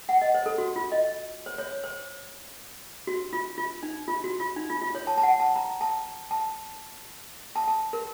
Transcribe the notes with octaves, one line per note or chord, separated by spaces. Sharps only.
F#5
D#5
C5
A4
F#4
F4
D#5
C5
C#5
C5
F#4
F4
F4
D#4
F4
F#4
F4
D#4
F4
F4
C#5
A5
A5
F#5
A5
A#5
A5
A5
A5
A5
A#4